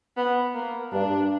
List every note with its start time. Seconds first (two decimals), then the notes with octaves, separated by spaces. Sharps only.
0.17 B3
0.55 A#3
0.92 G2 D4